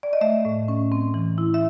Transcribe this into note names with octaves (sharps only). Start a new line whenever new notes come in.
D5
D#5
A3 E5
A2
C#4
C4
E3
E4
E5